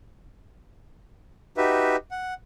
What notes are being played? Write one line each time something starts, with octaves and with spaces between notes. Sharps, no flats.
D#4 F#4 G4 B4 E5
F#5